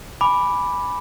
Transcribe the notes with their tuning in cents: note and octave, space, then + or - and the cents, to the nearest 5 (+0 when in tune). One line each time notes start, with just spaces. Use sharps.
G#5 +0 B5 +0 D6 +0